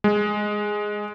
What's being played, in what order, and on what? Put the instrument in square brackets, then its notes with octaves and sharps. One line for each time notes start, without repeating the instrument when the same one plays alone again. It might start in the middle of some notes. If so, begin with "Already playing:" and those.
[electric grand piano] G#3